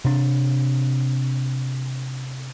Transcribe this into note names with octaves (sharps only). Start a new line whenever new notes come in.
C3 D4